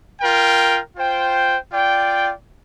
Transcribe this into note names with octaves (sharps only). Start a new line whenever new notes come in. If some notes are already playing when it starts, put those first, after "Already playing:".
F4 A#4 G5
F4 C5 G5
F4 D5 G5